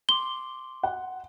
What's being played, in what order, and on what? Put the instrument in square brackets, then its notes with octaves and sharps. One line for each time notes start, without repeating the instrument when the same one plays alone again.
[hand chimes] C6 D6 [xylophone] G7
[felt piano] F#5